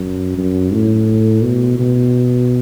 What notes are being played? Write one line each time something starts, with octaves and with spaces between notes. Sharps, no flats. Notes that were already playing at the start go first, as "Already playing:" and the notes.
Already playing: F#2
F#2
A2
B2
B2